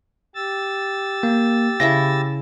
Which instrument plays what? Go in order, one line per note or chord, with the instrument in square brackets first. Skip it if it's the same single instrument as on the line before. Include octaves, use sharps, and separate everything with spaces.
[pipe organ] G4 E6 A6
[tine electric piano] A#3
[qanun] C#3 E4 E5 [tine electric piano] A#6